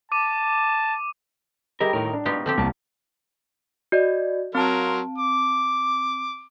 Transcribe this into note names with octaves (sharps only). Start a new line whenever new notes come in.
A5 D6 D#7
G3 E4 G4 G#4 A#4 D#5
D2 A2 D#3 A#4
D4
G#2 B2 B3 F4 G4
F3 C4 G4 A4
C2 A#3 A5
F#4 D5 D#5
F#3 C4 A#4 A5 C6
D6